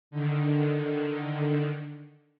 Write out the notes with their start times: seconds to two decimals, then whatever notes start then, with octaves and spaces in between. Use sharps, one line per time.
0.11 D3 D#3